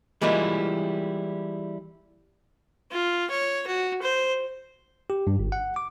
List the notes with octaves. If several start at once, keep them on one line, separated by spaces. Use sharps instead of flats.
E3 G3 G#3 A#3 E4 F4
F4
C#5
F#4
C5
G4
G2
G1
F#5
D6